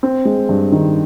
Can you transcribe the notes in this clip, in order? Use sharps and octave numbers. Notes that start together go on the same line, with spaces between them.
C4
G#3
G2
D#3